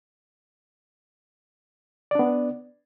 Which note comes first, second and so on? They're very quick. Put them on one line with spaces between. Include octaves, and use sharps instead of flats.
D5 D4 B3